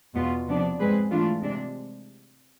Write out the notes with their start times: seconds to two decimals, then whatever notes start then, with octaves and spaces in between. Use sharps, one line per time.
0.14 E2 B2 B3 F4
0.46 C3 F3 B3 D4
0.78 G#2 G#3 C4 G#4 B4
1.10 E3 A3 D4 F4
1.41 C3 G#3 D4